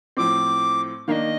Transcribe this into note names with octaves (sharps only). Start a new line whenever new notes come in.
A2 F3 C4 D6
D#3 A#3 D4 D#5 F5